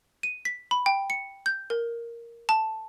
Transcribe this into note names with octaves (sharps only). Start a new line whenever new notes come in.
D#7
B6
B5
G5
C#7
G6
A#4
A5